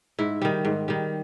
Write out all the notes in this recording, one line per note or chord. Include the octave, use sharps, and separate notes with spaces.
G#2 E4
D#3 G3
G#2
D#3 G3